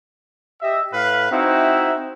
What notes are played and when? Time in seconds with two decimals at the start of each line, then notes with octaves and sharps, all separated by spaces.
0.62 G4 D#5 E5
0.93 A2 B4 F5
1.31 C4 D#4 E4 F#4 E5